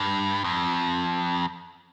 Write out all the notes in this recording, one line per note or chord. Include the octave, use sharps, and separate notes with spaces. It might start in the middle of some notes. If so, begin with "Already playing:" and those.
Already playing: G2
F2